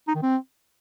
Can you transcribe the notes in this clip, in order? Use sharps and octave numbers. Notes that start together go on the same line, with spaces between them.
D#4
D#3
C4